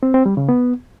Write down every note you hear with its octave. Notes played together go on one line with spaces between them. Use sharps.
C4
C4
G3
C#3
B3